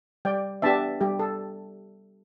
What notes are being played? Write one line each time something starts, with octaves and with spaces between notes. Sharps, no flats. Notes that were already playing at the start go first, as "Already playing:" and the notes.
G3 D5 G5
B3 D4 G4 E5 A5
G3 G4
A4